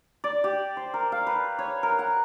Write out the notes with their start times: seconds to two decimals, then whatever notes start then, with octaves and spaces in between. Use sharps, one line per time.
0.24 D5
0.44 G4
0.77 C5
0.94 A#4
1.12 F5
1.27 B4
1.59 C#5
1.83 A#4
1.99 F#5